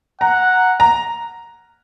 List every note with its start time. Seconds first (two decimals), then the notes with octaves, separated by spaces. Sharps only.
0.21 F#5 A#5
0.80 A#5